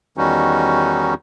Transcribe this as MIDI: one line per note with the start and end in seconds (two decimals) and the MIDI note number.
0.17 1.14 40
0.17 1.14 51
0.17 1.14 55
0.17 1.14 61
0.17 1.14 63
0.17 1.14 66